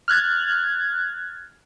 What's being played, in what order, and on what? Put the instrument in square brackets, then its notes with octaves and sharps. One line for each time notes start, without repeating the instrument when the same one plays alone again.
[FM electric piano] F6 F#6 G#6 A6